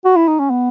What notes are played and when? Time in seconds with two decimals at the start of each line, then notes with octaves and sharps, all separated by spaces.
0.05 F#4
0.16 E4
0.28 D#4
0.39 C#4
0.51 B3